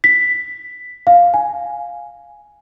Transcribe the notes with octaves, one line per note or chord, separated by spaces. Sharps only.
B6
F5
G#5